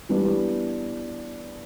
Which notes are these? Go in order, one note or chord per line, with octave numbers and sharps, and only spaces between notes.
E3 G3 B3 D4